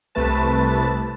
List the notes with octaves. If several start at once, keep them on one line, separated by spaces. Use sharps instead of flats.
C2 C3 A3 B4 A5